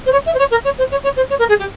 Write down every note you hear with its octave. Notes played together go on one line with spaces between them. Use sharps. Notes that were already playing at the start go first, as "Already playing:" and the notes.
C5
C#5
E5
C5
C#5
A#4
C#5
C5
C#5
C#5
C5
C#5
A#4
G#4
G4